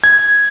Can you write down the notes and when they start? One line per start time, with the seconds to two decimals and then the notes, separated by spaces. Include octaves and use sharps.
0.04 G#6